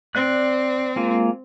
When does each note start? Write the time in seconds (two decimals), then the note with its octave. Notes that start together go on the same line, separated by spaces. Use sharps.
0.15 C4 D5 F#6
0.96 G#3 A#3 F4